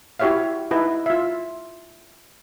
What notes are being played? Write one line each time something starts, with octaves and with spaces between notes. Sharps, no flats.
E4 F#4 G4 C#5 E5 F5
D#4 E4 B4
F4 E5